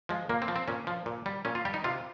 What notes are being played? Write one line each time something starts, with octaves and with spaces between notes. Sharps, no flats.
F3 G#3
A#2 A#3
C4
F3
C4
A#2 C#4
F3
A#2
G3
A#2 C#4
F4
G3 G4
D#4
C3 F4